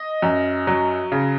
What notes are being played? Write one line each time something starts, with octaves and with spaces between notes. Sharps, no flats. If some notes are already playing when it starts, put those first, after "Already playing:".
Already playing: D#5
F#2
F#3
C#3